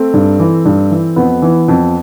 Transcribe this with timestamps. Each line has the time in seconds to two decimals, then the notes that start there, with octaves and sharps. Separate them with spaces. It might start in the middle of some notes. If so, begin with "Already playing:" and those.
Already playing: A3 C4
0.14 G2
0.40 E3
0.65 G2
0.91 E3
1.16 F2 B3
1.42 E3
1.68 F2